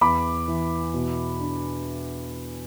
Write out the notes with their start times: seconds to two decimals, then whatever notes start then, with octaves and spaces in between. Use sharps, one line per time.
0.01 E2 B5 D6
0.48 E3
0.94 B2
1.40 D4